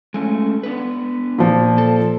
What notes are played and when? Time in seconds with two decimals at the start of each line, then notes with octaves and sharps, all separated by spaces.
0.14 G#3 A3 C#4
0.63 B3 D4 B4
1.38 A#2 F3
1.78 A4